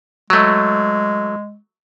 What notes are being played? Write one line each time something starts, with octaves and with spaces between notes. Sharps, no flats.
F#3 G#3 A3